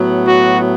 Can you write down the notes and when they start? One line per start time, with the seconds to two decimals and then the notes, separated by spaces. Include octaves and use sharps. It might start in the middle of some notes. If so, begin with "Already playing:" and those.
Already playing: A2 F#3 B3
0.26 F#4